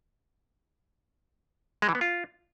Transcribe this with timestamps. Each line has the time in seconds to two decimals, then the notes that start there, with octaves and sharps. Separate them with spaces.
1.82 G#3
1.89 E3
1.95 B3
2.01 F4